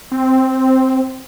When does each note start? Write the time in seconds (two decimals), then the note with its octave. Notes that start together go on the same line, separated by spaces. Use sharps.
0.11 C4